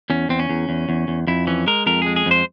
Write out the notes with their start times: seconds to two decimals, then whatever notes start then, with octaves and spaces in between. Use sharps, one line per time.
0.10 E2 C#4
0.29 E2 C4
0.39 C#4
0.49 E2
0.69 E2
0.89 E2
1.08 E2
1.27 F2 E4
1.47 E3 C#4
1.67 G#3 A#4
1.86 F2 A#4
2.02 G#3 G#4
2.16 G#4
2.26 F2 C5